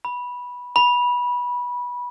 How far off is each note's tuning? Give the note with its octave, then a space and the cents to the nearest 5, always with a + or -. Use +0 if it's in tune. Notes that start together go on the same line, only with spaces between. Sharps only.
B5 -10
B5 -20